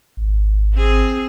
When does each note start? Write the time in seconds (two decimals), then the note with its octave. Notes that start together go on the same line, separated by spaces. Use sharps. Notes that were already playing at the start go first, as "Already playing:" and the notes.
0.17 G#1
0.74 C4 G#4